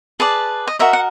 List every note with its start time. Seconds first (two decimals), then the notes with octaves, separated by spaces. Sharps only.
0.20 G#4 B4 D5 A5
0.67 D#5
0.79 F#4 A#4 D#5 E5
0.93 F#5